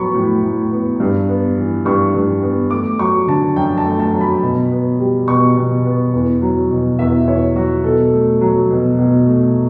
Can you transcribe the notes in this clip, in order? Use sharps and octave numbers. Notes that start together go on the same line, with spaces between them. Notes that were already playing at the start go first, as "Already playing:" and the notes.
Already playing: A2 F#3 B3 B5 C#6
A2
A2
B3
G2
B3
E3
G2 C#6
G2
B3
A3 D6
F#3 C#6
D3 A5
F#2 G5
A5
A3
A5
F#3
B5
B2
B3
G3
B2 C#6
B2
B3
E2
F#3
B2
E2 E5
E2 C#5
F#3 F#4
B2 A4
A3
F#3
B2
B2
A3